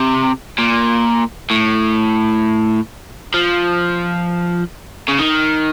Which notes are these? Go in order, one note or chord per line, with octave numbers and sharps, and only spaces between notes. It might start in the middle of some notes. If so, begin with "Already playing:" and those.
Already playing: C3
A#2
A2
F3
C#3
D#3